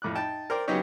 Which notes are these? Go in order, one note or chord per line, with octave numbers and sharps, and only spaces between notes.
F2 A2 D6 F#6
D#4 G5 A5
A#4 C5 D5 G5
C#3 F#3 B3 D#4 G4 C#5